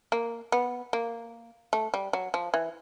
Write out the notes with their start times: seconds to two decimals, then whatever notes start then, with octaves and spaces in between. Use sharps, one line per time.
0.12 A#3
0.52 B3
0.93 A#3
1.73 A3
1.94 G3
2.13 F#3
2.34 F3
2.54 E3